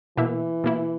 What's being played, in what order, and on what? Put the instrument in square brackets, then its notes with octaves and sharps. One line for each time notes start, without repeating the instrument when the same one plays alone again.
[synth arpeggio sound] B2 A#3 E4 [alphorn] E3
[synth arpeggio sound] B2 A#3 E4